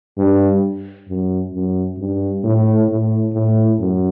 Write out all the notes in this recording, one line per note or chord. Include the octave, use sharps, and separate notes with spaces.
G2
F#2
F#2
G2
A2
A2
A2
F#2